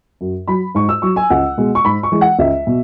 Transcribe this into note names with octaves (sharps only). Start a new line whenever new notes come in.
F#2
F#3 B5
G#2 C#6
E6
F#3 C#6
G#5
C#2 F#5
B2 G#3
C#6
G#2 B5
C#6
E3 G#3
F#5
C#2 E5
B2